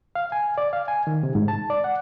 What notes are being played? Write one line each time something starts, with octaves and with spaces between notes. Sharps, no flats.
F5
G#5
D5
F5
G#5
D#3
C3
G#2
A5
D5
F#5